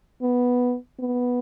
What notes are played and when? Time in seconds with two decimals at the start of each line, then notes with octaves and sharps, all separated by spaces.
0.22 B3
0.99 B3